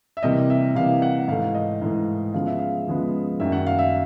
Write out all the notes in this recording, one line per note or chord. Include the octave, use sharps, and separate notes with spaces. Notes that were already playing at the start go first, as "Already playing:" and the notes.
E5
C3 E3 G3 A#3 D#5
E5
C3 E3 G3 A#3 F5
F#5
G#2 E3 A3 F5
D#5
G#2 E3 A3
C#3 F3 G#3 B3 F5
E5
F5
C#3 F3 G#3 B3
F#2 D#3 G3 A#3 E5
F#5
F5
E5